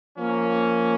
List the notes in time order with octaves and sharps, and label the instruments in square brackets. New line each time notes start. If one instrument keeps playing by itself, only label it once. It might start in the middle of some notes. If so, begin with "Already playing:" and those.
[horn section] F3 A#3 C#4